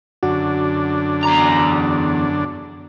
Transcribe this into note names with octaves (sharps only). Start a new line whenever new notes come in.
F#2 D3 D4 F#4
E2 A#5